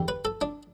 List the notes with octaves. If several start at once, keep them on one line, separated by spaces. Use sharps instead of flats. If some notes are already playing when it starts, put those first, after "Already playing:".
Already playing: E2 D3 G3
B4
A4
D4